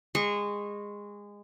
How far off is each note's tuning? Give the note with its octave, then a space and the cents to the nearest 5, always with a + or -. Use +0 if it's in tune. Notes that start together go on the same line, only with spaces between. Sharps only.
G#3 -20 C#6 -30